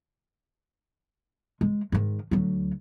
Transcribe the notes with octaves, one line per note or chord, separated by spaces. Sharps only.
G#3
G#2 D#3
D2 F#3